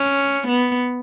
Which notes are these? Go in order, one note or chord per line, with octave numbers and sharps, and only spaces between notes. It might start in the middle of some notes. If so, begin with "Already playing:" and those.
Already playing: C#4
B3